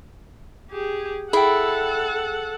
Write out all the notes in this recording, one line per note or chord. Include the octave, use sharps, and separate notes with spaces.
G4 G#4
E4 G#4 A4 F#5 G5